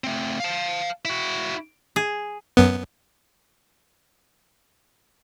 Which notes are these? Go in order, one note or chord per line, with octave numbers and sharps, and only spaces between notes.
A3 C4
F5 A5
E4 F#4
G#4
F#2 B3